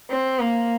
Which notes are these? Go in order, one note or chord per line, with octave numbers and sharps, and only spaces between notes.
C4
A#3